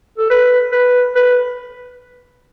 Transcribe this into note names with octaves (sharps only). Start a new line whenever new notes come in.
A4
B4
B4
B4